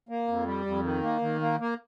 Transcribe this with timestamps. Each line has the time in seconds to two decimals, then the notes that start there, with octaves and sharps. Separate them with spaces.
0.09 A#3
0.28 F2
0.46 G3
0.66 F2
0.83 D#3
1.03 A#3
1.21 D#3
1.41 A#3
1.60 A#3